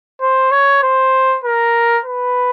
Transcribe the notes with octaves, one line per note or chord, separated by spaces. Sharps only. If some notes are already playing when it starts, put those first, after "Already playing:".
C5
C#5
C5
A#4
B4